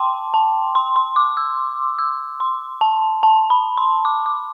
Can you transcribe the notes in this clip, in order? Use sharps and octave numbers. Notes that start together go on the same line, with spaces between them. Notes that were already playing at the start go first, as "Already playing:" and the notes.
Already playing: G5 A5 C6 D6
A5
C6
C6
D6
E6
E6
C6
A5
A5
B5
C6
D6
D6